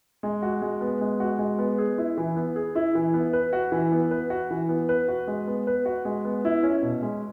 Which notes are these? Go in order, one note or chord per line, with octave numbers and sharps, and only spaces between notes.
G#3
F#4
G#3
B3
G#3
F#4
G#3
B3
G#4
E4
E3
B3
G#4
E4
E3
B3
B4
F#4
E3
B3
B4
F#4
E3
B3
B4
F#4
G#3
B3
B4
F#4
G#3
B3
E4
C#4
B2
G#3